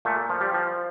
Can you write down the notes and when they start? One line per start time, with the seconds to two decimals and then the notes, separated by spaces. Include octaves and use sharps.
0.05 A#2 A3
0.30 F3
0.40 G3
0.54 F3